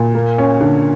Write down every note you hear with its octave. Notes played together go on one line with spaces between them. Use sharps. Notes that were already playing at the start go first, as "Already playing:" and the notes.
Already playing: A#2
A#3
C#4
D3